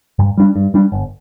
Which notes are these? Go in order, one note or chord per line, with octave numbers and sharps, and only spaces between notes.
G2
G3 D4
G2
G3 D4
G1